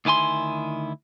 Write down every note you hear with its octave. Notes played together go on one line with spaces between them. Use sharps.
D2 D#3 E4 G#5 C6